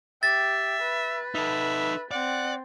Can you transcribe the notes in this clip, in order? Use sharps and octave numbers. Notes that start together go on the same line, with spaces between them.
G4 E5 A6
B4
D#4 A4 E5
C4 D5 F#5